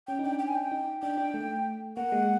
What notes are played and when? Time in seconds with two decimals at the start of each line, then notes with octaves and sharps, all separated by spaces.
0.07 C#4 G5
0.19 D#4
0.24 D4 G5
0.39 G5
0.48 G#5
0.55 G5
0.71 D#4
1.02 D4 G5
1.17 D4
1.34 A3
1.97 A#3 F#5
2.12 G#3